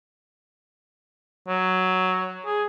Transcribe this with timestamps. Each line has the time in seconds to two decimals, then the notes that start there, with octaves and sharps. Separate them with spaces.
1.48 F#3
2.46 G#4